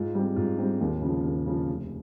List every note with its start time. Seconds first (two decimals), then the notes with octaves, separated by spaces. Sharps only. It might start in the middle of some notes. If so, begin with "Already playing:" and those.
Already playing: G#2 F4
0.15 G3 C4
0.36 G#2 F4
0.58 G3 C4
0.81 D#2
1.02 C#3 F3
1.25 D#2
1.46 C#3 F3
1.67 F1